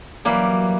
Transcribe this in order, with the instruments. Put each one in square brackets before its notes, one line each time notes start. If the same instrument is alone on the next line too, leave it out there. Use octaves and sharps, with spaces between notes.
[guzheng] E3 G3 A#3 [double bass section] F#3